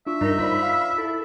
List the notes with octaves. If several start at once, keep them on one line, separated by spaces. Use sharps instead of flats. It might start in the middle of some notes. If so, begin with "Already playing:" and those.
D4 F4 E5 C#6
G2 D#4 A#4
F4 C5 D5 B5
F5
E4 A4